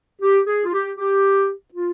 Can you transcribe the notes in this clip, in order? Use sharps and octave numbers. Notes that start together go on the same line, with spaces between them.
G4
G#4
F4
G4
G4
F4